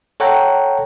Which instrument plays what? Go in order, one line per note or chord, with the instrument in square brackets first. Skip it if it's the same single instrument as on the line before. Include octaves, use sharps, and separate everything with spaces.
[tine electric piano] A4 C#5 F#5 G5 A#5